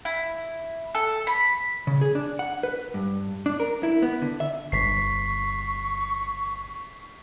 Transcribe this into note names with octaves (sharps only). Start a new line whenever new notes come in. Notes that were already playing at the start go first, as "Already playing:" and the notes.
E4
A4
B5
C#3
G#4
D4
F#5
B4
G2
D4
A#4
E4
B3
D3
E5
G1 C#6 B6 C7